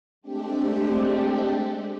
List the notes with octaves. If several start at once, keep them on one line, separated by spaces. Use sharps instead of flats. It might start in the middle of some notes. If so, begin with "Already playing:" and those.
G#3 A3 C4 D4 G4